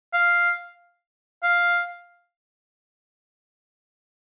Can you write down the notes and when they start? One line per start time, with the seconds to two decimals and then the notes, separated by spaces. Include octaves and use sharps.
0.13 F5
1.43 F5